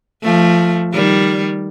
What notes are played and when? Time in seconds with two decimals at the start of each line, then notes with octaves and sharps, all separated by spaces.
0.22 F3 A3
0.93 D#3 G3